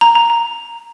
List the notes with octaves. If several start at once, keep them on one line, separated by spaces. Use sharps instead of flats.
A#5
A#5
A#5